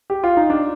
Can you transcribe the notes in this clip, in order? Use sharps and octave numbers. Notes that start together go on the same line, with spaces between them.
G4
F4
D#4
D4